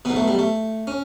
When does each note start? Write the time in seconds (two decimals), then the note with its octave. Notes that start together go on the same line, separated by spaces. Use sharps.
0.05 B1 B2 B3
0.16 A3
0.28 G3
0.39 A3
0.87 C#4